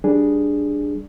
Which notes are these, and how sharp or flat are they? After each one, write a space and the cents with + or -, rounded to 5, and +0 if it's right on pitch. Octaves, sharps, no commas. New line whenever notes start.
G3 +0 D4 +0 G#4 +0